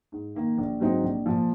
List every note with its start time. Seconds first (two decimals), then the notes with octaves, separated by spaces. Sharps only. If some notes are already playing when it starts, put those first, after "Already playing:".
0.12 G#2
0.35 D#3 A#3
0.58 A#1
0.80 G#2 F#3 C4 D#4
1.03 A#1
1.26 A#2 F3